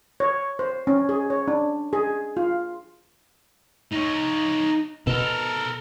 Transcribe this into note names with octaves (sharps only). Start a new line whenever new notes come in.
C#5
C5
C#4
G#4
C#5
D4
G#4
F4
D#4 C#5
B2 A4 A#4